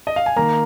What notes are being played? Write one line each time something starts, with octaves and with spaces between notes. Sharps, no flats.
D#5
F5
G#5
D#3 A#3 A#5